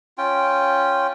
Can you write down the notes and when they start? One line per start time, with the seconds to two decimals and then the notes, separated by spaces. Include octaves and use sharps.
0.18 C#4 F4 G5